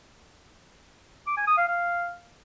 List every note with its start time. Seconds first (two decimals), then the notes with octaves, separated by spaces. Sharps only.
1.27 D6
1.37 G#5
1.47 D#6
1.57 F5
1.68 F5